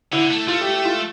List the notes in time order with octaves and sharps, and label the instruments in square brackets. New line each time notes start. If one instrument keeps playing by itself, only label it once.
[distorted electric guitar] D3 [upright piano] E4
[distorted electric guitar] A3
[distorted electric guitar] A3 [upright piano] F4
[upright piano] G4
G4
F4